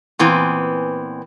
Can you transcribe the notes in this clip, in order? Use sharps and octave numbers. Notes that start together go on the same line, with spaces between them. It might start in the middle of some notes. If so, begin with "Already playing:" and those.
A#2 E3 B3 C4